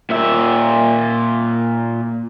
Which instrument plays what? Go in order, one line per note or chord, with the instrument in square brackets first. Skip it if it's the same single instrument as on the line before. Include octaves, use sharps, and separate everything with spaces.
[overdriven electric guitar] A#2 E5